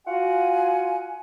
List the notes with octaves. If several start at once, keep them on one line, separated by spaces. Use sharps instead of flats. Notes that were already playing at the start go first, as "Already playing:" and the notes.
F4 F#4 F#5 G#5